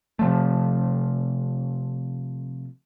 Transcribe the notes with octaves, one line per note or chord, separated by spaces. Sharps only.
C3 F3 A3